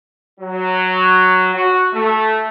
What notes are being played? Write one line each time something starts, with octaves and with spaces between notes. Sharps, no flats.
F#3
F#4
A3